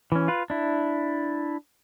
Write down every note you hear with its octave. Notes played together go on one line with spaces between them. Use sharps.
E3 C#4
F4 B4
D4 E4